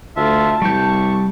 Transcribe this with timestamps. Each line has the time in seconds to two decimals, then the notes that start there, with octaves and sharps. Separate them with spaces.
0.16 D2 F4 E5 A5
0.62 C2 G3 C#6 G6